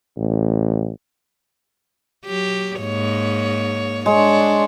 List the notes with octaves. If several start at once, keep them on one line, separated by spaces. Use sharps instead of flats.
A1
F#3 G4
G#2 A#3 C#5
G#3 D4 C#5